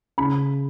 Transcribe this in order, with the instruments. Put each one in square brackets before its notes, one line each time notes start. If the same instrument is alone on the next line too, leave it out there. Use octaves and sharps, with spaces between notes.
[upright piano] C#3 B5